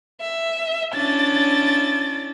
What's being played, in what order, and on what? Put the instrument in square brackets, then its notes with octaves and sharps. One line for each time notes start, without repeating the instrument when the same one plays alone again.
[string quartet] E5
[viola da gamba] C#4 D4 E4 [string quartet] A6